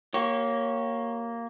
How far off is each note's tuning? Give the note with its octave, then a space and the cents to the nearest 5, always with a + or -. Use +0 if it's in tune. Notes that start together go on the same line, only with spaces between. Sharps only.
A#3 +0 G4 -30 C#5 +0